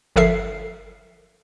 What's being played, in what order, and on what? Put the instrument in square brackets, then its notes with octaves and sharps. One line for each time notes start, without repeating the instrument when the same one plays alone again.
[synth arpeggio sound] G1 F3 A4 A#4 E5 C7